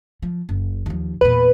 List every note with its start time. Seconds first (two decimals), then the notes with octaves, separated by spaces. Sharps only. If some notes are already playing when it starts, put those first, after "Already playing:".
0.22 F3
0.49 F#1
0.86 D#2 F3
1.21 E2 A#2 B4